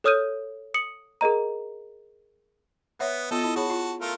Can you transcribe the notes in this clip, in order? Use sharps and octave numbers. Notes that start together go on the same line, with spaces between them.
A4 C#5 D#6 F6 G6 D#7
D#6 C#7 F#7
G#4 A#4 D#5 A#5
B3 C#5 E5 F#5
B3 F4 A4 D#5
E4
F#4 G#4 C#5 A5 B5
F4
A3 F4 A#4